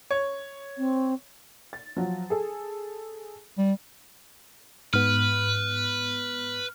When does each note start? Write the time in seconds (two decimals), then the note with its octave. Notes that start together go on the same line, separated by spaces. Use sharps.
0.11 C#5
0.78 C4
1.73 A6
1.97 F3 F#3
2.30 G#4 A4
3.58 G3
4.93 G#2 B3 B4 F6